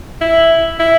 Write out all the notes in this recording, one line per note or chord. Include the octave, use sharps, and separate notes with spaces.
E4
E4